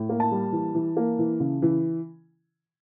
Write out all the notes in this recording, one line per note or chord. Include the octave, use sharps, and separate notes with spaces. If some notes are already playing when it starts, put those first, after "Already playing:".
Already playing: A2
A#3
A5
G3
E3
E3
A#3
E3
C#3
E3